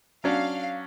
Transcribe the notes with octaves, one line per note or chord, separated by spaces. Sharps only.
F#3 C#4 D4 F5